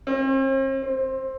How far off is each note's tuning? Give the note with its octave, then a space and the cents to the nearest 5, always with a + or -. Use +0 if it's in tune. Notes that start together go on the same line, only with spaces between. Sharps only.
C4 +45
C4 +15